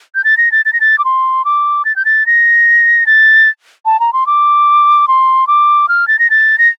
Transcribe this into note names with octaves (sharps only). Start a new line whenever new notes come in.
G6
A6
A#6
A6
A6
A#6
A6
D6
C6
D6
A6
G6
A6
A#6
A6
A5
A#5
C6
D6
C6
D6
F6
A6
A#6
A6
A#6